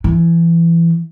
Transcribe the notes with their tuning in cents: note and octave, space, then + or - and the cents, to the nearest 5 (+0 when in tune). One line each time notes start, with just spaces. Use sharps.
E3 +25